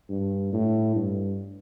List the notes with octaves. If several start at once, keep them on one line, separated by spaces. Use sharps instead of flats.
G2
A2
G2